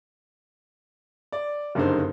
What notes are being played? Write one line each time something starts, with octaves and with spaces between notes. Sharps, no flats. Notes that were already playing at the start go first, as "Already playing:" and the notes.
D5
F#1 G2 D3 D#4 C5